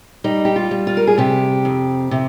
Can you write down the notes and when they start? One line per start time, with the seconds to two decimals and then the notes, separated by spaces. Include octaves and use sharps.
0.24 G3 D#4
0.45 G4
0.56 F4
0.71 G3
0.87 F4
0.97 A#4
1.07 G#4
1.18 C3 G4
1.65 F2
2.11 C3